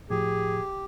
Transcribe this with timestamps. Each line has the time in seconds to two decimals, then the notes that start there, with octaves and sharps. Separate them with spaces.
0.10 A2 F3 G4 G#4